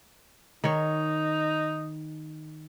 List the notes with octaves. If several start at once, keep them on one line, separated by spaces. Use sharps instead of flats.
D#3 D#4 C#5